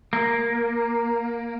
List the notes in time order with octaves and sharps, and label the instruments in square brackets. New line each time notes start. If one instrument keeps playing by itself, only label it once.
[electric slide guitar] A#3